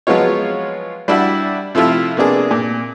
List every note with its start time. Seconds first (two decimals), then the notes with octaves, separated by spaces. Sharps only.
0.07 F3 F#3 G#3 B3 F4 C#5
1.08 G3 D4 E4 F#4
1.75 C3 F3 A3 E4 F4
2.17 C3 A#3 B3 D4 G#4
2.51 A#2